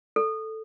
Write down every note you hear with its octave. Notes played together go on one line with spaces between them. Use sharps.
A4